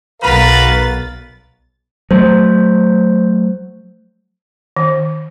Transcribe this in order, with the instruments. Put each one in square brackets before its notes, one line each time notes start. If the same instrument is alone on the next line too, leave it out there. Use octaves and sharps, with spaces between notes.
[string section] B1 A6 [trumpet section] F#4 B4 B5 [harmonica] A#4 F5
[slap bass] F#3 A3 [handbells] C5
[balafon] D#3